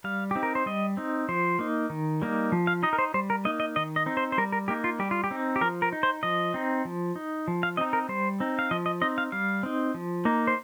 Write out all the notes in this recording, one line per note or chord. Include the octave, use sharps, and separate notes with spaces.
G3 F5
C4 D#4 G4
A#4
C5
G3 D#5
C4 D#4
F3 C5
A#3 D#4
D#3
G3 A#3 D#4
F3
F5
D#4 D#5
A#4
C5
G3 C5
A#4
A#3 D#4 D#5
D#5
D#3 D#5
D#5
C4 D#4
C5
C5
G3 A#4
A#4
A#3 D#4 G4
F4
G3 G4
F4
G4
C4 D#4
G4
F3 A#4
A#4
D#4
C5
F3 D#5
C4 D#4
F3
D#4
F3
F5
C4 D#4 D#5
A#4
G3 C5
C4 D#4
F5
F3 D#5
D#5
C4 D#4 D#5
F5
G3 F5
C4 D#4
F3
A#3 D#4
C5